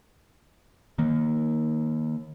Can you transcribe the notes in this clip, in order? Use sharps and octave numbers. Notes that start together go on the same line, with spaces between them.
D#3 A#3